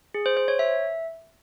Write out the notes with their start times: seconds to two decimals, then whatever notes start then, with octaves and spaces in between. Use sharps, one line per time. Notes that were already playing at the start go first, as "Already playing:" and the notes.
0.14 G#4
0.26 C5
0.37 C5
0.48 C#5
0.59 E5